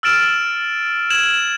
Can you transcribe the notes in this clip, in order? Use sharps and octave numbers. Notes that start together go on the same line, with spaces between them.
E6 F6 A6 D7 E7
G#6 E7 F#7